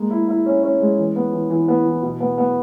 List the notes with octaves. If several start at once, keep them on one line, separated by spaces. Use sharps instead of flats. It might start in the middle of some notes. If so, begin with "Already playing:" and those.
Already playing: G#3 A#3
E4
E4
C#4
C#4
G#3
E3
B3
E3
E3
B3
E3
B2
B3
B3